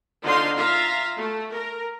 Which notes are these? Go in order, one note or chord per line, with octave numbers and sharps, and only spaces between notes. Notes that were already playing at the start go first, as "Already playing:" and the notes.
D3 D#4 F4 C5 F5 C6
F4 E5 F5 A#5
A3
A#4